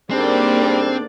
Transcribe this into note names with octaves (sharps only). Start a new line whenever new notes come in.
G#2 D3 G3 A#3 C4 D4 D5